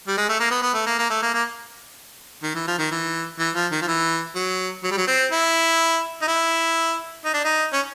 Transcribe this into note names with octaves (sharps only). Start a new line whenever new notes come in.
G3
G#3
A3
A#3
B3
B3
A3
A#3
A#3
A3
A#3
A#3
D#3
E3
F3
D#3
E3
E3
F3
D#3
F3
E3
F#3
F#3
G3
F#3
C4
E4
D#4
E4
D#4
D4
D#4
C#4